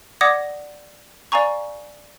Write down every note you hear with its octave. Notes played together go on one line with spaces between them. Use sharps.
D5 F#5 D6 D#6 G#6 A#6
D5 F5 G#5 A#5 C#6